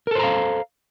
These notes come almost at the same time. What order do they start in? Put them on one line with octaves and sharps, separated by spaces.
A#4 A4 C5 A#5 F5